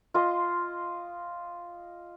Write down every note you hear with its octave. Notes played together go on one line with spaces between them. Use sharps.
F4 D#5 C6